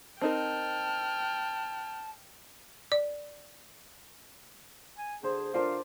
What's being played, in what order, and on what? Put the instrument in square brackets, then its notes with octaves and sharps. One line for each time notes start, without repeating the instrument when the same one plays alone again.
[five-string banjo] C4 D#4 A#4 [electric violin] G5 F6 [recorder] A5
[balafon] D5
[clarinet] G#5
[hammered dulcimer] D3 C5 [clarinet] G#4
[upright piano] D4 F4 A#4 [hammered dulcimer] A4 C5 D5 [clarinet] F5